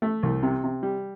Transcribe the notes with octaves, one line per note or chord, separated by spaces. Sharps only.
A3
C2
C3
C3
G3